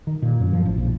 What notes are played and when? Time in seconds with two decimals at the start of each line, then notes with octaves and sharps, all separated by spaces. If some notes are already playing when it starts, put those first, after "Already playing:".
0.07 D#3
0.22 A#2
0.40 F#2
0.53 F3
0.65 A1
0.78 A#1